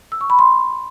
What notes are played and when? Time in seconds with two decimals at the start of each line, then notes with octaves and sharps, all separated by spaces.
0.12 E6
0.21 C#6
0.30 B5
0.39 C6